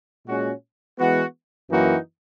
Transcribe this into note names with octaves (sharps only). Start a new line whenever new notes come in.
A#2 G#3 C#4 F#4
E3 G#3 B3 F#4
F#2 E3 A#3 D#4 F#4